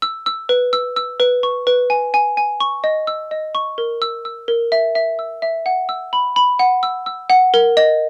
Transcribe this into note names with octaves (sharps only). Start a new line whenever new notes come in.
E6
E6
B4
E6
E6
B4
C#6
B4
G#5
G#5
G#5
C#6
D#5
E6
D#5
C#6
A#4
E6
E6
A#4
E5
E5
E6
E5
F#5
E6
B5
B5
F#5
E6
E6
F#5
A#4
D#5